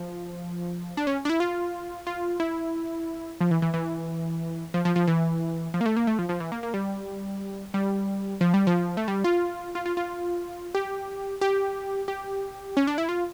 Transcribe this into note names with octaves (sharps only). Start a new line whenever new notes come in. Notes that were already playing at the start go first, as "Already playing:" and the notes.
Already playing: F3
D4
C#4
D4
E4
F4
F4
E4
F3
E3
E3
E3
F3
F3
F3
E3
F3
A#3
A3
A#3
A3
F3
F3
E3
A#3
A#3
G3
G3
F3
G3
F3
A3
G3
F4
F4
F4
F4
G4
G4
G4
C#4
D4
E4
F4